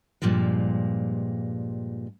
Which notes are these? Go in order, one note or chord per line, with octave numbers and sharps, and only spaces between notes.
G2 A#2 F3 G3 G#3